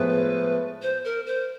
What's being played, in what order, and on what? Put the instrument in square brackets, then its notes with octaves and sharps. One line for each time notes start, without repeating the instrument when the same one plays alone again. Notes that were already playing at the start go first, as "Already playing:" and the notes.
Already playing: [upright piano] A2 F3 G#3 B3 [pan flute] B4
[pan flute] C5
A#4
C5